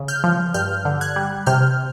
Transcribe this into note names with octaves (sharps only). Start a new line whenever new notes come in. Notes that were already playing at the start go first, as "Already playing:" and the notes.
Already playing: C#3
F6 G6
F3
G2 F6 G6
D3
F#6 G#6
G3
C3 F6 G6